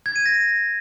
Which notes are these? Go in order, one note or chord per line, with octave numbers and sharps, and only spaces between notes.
G#6
D#7
A#6